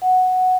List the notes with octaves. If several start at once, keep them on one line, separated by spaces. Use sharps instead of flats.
F#5